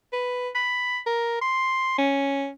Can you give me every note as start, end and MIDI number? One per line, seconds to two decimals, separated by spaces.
0.13 0.49 71
0.55 1.00 83
1.06 1.37 70
1.42 1.96 84
1.98 2.49 61